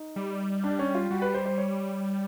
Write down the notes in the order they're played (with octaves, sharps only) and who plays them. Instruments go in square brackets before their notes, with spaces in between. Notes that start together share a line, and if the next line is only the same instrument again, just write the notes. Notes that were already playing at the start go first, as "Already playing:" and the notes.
Already playing: [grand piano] D#4
[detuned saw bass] G3
[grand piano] D4
C#4
F4
[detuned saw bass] G3 [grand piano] F#4
[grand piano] B4
C5
C5
C#5